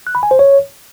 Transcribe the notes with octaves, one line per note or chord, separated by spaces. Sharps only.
F#6
B5
G#5
C5
C#5